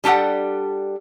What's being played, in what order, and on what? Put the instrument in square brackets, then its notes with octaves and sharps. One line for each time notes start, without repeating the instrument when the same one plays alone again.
[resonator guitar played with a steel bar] G3 D4 G4 A4 F#5